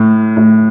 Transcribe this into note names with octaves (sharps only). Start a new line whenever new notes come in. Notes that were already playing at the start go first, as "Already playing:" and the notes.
Already playing: A2
A2